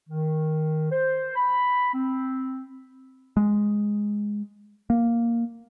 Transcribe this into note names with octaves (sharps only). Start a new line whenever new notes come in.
D#3
C5
B5
C4
G#3
A#3